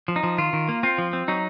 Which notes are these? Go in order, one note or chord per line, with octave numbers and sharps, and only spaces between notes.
F3
D#4
F3
D#3 F4
D#3
A#3
C4 F4
F3
C4
F#3 D#4